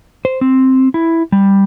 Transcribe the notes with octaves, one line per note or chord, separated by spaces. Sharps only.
C5
C4
E4
G3